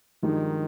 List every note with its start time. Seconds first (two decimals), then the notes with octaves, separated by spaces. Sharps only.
0.23 G2 D#3 F3 G#3 D#4 G4